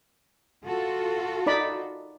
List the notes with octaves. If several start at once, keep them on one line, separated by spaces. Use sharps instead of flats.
F4 F#4 A4
D#4 D5 B5